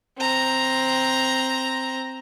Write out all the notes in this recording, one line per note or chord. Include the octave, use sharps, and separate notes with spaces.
C4 A#5